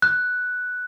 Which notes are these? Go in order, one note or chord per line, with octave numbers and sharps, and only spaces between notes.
F#6